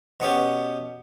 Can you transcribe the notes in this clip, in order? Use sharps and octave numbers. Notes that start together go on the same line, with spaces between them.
B2 B3 C#4 G4